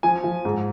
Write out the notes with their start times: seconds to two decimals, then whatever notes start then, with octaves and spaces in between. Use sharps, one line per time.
0.03 F3 G#5
0.24 F3
0.45 G#2